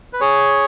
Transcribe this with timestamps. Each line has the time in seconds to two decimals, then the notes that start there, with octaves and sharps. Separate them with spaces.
0.13 B4
0.21 G#4 C#5